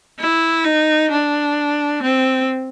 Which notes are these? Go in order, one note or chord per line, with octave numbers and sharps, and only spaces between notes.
E4
D#4
D4
C4